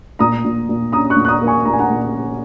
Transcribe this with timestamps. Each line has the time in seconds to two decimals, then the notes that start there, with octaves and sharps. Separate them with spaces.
0.19 A#2 A#5 D#6
0.45 A#2
0.69 A#2
0.92 C#4 A#5 D#6
1.10 C#6 F#6
1.17 A#2
1.25 F#6
1.28 A#5 D#6
1.42 A#3
1.47 G#5 C#6
1.65 A#2 A#5
1.73 G#5
1.79 F#5 A#5
1.90 A#2
2.13 C#4